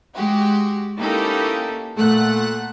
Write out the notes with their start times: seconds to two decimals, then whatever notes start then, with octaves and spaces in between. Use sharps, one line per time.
0.15 G#3 F#4 G4
0.98 A#3 C#4 D#4 E4 G4 A4
1.96 A#2 A3 F#5 F#6